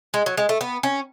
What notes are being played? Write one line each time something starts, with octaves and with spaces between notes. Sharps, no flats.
G#3
F#3
G#3
A3
B3
C#4